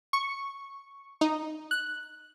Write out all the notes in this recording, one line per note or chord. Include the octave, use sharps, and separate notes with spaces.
C#6
D#4
F#6